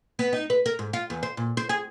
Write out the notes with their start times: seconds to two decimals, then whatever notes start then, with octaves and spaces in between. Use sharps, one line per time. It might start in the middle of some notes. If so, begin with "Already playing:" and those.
0.19 B3
0.33 D#4
0.50 B4
0.66 A#4
0.79 G#2
0.93 F4
1.10 E2
1.23 C5
1.37 A#2
1.57 C5
1.69 G#4